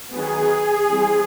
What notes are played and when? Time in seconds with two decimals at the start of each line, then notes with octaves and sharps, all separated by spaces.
0.14 D#3 F#3 B3 G#4
0.88 E3 G3 C4